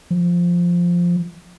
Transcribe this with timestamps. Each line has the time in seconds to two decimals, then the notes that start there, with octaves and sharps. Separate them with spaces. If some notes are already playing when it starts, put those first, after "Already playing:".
0.11 F3